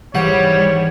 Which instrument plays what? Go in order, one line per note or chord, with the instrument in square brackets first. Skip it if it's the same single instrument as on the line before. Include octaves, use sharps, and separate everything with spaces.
[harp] G#1 E3 [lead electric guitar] G3 [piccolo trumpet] C#5 [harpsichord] F#5